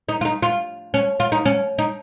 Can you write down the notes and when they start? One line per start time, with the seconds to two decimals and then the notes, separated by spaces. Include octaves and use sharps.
0.09 D#4
0.21 F4
0.25 D#4
0.42 F4
0.94 C#4
1.20 F4
1.32 D#4
1.46 C#4
1.78 D#4